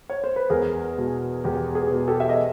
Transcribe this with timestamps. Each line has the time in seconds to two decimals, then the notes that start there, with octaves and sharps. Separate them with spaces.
0.10 C#5
0.24 C5
0.36 B4
0.50 E2 G#4 A#4
0.98 B2
1.44 E2 G4
1.75 G#4
1.91 B2
2.07 G4 A4
2.20 E5
2.29 D#5